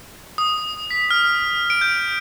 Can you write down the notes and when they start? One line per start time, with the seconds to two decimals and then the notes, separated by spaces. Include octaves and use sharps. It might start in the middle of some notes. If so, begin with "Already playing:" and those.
0.38 D#6
0.91 B6
1.11 F6
1.70 D7
1.81 G6